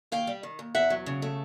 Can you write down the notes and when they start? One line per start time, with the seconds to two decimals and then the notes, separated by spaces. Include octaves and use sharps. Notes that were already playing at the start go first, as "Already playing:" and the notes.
0.12 D#2 F5 G5
0.27 G3
0.43 D#3
0.59 D#2
0.75 E2 E5 F#5
0.90 F#3
1.06 C#3
1.22 A3